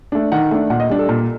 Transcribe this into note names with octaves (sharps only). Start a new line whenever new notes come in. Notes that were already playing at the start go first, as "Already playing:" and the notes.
A3 D4
D#3 F#5
A3 D4
A#2 F#5
D#5
G3 D4
A4
A#2